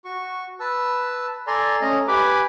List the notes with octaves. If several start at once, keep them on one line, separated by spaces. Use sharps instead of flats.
F#4 C#6
B4 A5 E6
A4 D5 G#5 A#5 C6
A3 C#4 D#5 A#5
G4 B4 G#5 B5 D6